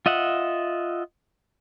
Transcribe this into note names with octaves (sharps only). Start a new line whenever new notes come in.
F4 D#5 E5 F#5